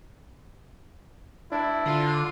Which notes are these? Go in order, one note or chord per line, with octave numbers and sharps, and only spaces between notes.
D4 E4
D3 F4